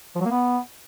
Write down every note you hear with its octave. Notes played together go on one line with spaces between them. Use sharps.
F3
F#3
A#3
B3